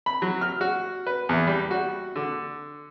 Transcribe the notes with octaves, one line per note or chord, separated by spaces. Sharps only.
B5
F#3
F6
F#4
B4
E2
G3
F#4
D3